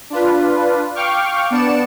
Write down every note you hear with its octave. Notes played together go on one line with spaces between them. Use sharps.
D4 F4 B4
F5 G5 C#6 D6 F6
B3 D4 D5 C#7 E7